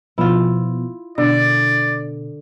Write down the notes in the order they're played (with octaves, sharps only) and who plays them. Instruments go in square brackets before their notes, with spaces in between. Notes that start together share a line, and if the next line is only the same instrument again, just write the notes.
[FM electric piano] B2 F3 B3 [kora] E4 F4
[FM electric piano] B2 [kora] D3 [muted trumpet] D5